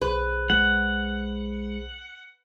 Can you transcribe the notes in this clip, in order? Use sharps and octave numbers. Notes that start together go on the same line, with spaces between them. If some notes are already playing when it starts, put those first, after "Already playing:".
B1 G#4 B4 C5
G#3 F#5